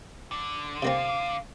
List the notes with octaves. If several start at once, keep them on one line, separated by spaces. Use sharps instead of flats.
D3
C3 A#3 C4 F5